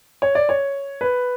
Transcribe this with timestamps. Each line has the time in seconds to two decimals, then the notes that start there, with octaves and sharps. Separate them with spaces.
0.22 C#5
0.35 D5
0.49 C#5
1.01 B4